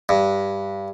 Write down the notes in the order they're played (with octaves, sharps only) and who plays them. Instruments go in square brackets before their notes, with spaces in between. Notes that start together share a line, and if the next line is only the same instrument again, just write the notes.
[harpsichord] G2